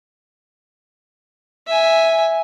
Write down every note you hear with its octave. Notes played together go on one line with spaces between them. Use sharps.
E5 G#5